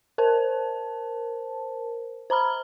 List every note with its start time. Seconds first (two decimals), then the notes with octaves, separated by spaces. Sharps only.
0.18 A#4 C5 A5
2.30 C5 A#5 B5 F6